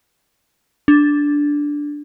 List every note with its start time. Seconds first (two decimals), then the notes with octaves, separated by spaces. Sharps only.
0.88 D4